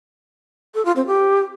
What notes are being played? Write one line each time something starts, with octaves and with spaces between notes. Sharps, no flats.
A4
F4
C4
G4